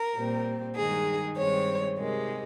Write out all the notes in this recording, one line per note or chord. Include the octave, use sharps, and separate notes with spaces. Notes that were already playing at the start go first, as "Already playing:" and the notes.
Already playing: A#4
A#2 G3 C4
G2 D#3 G#3 D#4 G#4
G2 D#3 G#3 C4 C#5
C3 D#3 G#3